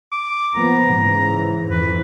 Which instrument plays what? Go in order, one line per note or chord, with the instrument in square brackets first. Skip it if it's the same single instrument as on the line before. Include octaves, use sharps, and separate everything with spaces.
[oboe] D6
[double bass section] F3 A#3 B3 [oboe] A#5
[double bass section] G#2 C#3 E3
[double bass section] F2 E3 [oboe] B4